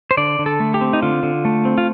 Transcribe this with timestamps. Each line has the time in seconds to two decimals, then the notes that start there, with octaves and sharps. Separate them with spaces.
0.11 C5
0.17 D3 D5
0.39 D3
0.46 A4
0.60 A3
0.74 G4
0.81 C4
0.93 D#4
1.02 D3 F4
1.23 D3
1.45 A3
1.65 C4
1.78 F4